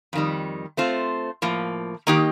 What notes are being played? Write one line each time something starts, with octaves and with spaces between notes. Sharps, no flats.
F2 D#3 G3
A3 C4 F4 C5
A2 F3 A#3
D#3 A#3 D#4 G4